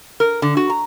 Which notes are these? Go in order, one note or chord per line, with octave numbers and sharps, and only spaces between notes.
A#4
D3
F#4
A#5